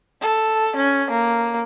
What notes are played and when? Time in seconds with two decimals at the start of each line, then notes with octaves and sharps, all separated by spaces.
0.21 A4
0.76 C#4
1.10 A#3